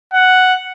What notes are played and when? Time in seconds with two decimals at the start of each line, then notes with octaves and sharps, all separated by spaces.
0.13 F#5